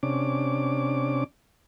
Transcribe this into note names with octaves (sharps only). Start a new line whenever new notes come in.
C3 C#4 D4 D6